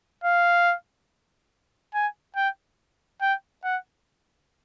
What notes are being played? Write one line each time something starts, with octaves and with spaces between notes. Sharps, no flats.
F5
G#5
G5
G5
F#5